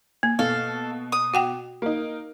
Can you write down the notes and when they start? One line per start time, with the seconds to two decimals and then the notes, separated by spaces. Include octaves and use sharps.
0.23 A#3
0.39 B2 A4 F5
1.12 D#6
1.34 F#4 F#5 G5
1.82 A#3 D#4